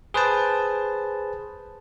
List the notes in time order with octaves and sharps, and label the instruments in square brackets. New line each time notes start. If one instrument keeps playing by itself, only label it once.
[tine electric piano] G#4 B4 C5 A5